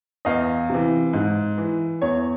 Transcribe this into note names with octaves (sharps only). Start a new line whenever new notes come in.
E2 D#5 F5
C3 E3
G#2
E3
E2 C#5